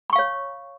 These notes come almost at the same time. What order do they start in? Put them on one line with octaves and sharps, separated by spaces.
B5 C#6 F5 C#5